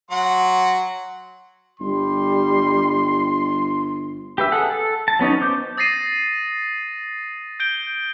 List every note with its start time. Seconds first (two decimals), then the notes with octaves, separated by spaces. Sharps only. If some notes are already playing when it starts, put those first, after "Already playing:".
0.11 F#3 F#5 C6
1.80 G1 G3 C6
4.38 G4 B4 E5
4.52 G#4 A4 F#5
4.70 A4
5.08 A5
5.19 F#3 B3 C#4 D#4
5.41 C5 D6 G6
5.77 D#6 A6 A#6 C7 D#7
7.60 G6 D7 G7